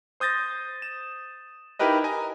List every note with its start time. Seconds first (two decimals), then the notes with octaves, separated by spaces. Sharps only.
0.20 C5 D#6 G6 A6 A#6
0.82 E7
1.79 D#4 E4 G4 A#4 B4 D#5
2.04 D#5 G#5 A#5